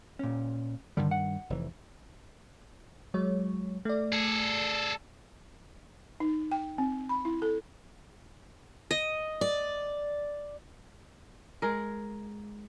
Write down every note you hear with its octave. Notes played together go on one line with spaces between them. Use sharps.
A#2 C#4
G2 D3 D#3 G3
F#5
F1 E3
F#3 G#3 C#5
A3 D5
G#4 A4
D#4
G5
C4
B5
E4
A4
D#5
D5
G#3 G#4 A#4